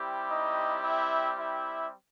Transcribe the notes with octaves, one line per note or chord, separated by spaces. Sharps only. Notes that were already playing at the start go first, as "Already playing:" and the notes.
Already playing: G3 C4 E4 G4
D#4 D#5
E4 E5
E4 E5